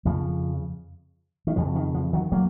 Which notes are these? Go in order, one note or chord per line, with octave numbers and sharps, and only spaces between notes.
F2 C#3 F3
D#3
F2 C#3 F3
D#3
F3
D#3 F#3
F#3 A#3